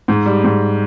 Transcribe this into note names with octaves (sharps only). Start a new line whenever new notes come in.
G#2
G3
G#2